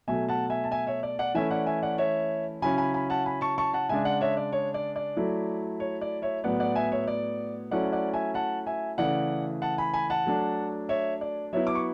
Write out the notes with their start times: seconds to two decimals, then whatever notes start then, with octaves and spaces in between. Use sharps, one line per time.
0.08 B2 F#3 A3 E5 G#5
0.29 F#5 A5
0.50 E5 G#5
0.64 A5
0.71 E5 G#5
0.87 C#5 E5
1.03 D5
1.19 D5 F#5
1.34 E3 A3 C#4 E4 E5 G#5
1.51 D5 F#5
1.66 E5 G#5
1.83 D5 F#5
1.98 C#5 E5
2.62 C#3 F#3 C#4 E4 G#5 B5
2.78 G#5 B5
2.94 G#5 B5
3.10 F#5 A5
3.26 G#5 B5
3.41 A5 C#6
3.58 A5 C#6
3.73 F#5 A5
3.89 C#3 G#3 D4 E5 G#5
4.05 D5 F#5
4.21 C#5 E5
4.37 D5
4.52 C#5
4.74 D5
4.96 D5
5.17 F#3 A3 E4
5.80 C#5
6.01 D5
6.22 C#5 E5
6.44 A2 F#3 B3 D5 F#5
6.60 D5 F#5
6.75 E5 G#5
6.92 C#5 E5
7.07 D5
7.71 F#3 A3 C#4 E4 D5 F#5
7.92 D5 F#5
8.14 E5 G#5
8.34 F#5 A5
8.67 E5 G#5
8.98 C#3 E3 A3 D5 F#5
9.62 F#5 A5
9.78 G#5 B5
9.94 G#5 B5
10.10 F#5 A5
10.26 F#3 A3 D4
10.89 C#5 E5
11.21 D5
11.53 F#3 B3 E4 C#5 E5
11.67 D6
11.75 C#6